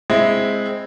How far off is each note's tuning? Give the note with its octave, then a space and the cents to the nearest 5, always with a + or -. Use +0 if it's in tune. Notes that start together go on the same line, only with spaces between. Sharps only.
G#3 +0 C4 +0 E4 +0